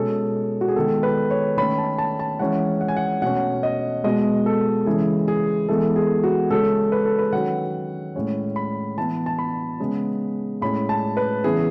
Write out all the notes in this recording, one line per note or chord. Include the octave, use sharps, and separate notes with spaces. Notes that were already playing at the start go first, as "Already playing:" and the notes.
Already playing: B2 G#3 C#4 A4
F#4
G#4
D#3 G#3 B3 A4
B4
C#5
D#3 A3 C#4 B5
A5
A5
A5
E3 G#3 C#4 F#5
F#5
G#5
F#5
B2 A3 C#4 F#5
D#5
B2 G#3 B3 D#5
A4
C#3 E3 G#3 G#4
G#4
E3 G#3 B3 A4
G#4
F#4
C#3 G#3 C#4 A4
B4
A4
B4
D#3 F#3 C#4 F#5
A2 G#3 C#4
B5
E3 B3 A5
A5
B5
C#3 G#3 B3
A2 G#3 C#4 B5
A5
B4
C#3 E3 B3 G#4